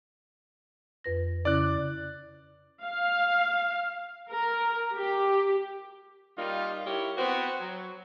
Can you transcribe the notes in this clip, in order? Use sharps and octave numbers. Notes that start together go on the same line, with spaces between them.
F2 B4 A#6
C#3 C#4 E4 D5 F#6
F5
A#4
G4
G3 A#3 D#4 F4
E4 G4 A#4 C#5
B3 C4 F#4
F#3